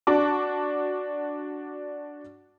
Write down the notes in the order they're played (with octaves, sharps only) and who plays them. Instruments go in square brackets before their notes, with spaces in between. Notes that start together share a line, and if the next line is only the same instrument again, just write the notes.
[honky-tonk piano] D4 F#4 A5 D6